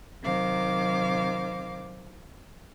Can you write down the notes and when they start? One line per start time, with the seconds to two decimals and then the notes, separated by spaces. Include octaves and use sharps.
0.22 C3 D#3 F#3 C5 F5 D6